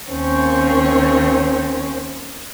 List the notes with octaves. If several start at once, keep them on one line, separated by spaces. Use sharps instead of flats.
D#2 C4 C#4 C#5